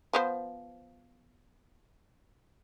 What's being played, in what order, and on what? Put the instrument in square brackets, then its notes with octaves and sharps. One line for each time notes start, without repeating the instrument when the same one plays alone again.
[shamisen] F3 B3 C5